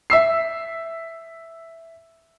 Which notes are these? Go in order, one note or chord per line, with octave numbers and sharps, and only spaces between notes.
E5 E6 C7